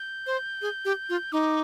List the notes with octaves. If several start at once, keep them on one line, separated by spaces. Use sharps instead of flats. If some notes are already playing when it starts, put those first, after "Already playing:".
Already playing: G6
C5
G#4
G4
F4
D#4 D6